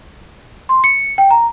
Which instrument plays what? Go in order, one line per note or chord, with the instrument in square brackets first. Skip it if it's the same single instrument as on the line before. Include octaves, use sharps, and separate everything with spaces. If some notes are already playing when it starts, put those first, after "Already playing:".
[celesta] C6
C#7
G5
A#5